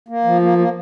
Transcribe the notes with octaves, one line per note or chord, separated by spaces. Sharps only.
A#3
F3
A#3
A#3